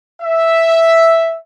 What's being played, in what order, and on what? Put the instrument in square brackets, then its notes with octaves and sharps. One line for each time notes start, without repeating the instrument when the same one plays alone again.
[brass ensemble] E5